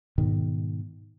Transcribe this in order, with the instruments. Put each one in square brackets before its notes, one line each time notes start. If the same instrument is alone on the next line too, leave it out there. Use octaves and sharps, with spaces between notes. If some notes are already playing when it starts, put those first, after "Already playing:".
[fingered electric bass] G#2 B2 D#3